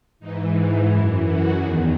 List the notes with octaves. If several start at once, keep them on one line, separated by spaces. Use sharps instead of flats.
G#2 E3 D#4
F#2 E3 E4
F#4
E2 D#3 G#4